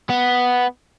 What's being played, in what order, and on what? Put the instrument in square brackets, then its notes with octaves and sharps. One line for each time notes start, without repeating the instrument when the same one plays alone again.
[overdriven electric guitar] B3